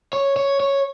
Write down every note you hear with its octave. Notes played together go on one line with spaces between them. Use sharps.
C#5
C#5
C#5